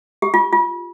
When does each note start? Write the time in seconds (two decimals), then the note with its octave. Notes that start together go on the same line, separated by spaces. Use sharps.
0.22 G4
0.34 F4
0.53 F4